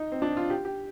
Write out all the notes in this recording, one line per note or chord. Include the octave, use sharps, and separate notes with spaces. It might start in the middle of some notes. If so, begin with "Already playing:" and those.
Already playing: D#4
C4
D4
F4
G4
G4